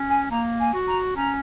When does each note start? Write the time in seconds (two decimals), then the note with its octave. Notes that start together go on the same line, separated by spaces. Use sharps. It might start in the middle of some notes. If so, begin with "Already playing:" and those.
Already playing: C#4
0.10 G#5
0.31 A#3 A#5
0.60 G#5
0.74 F#4
0.88 A#5
1.17 C#4 A#5